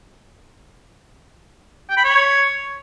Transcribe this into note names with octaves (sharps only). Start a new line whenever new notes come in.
G5
B5
C#5